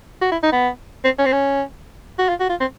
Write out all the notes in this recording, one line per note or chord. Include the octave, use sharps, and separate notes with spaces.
F#4
E4
D#4
B3
C4
C#4
C4
C#4
F#4
F4
F#4
F4
C4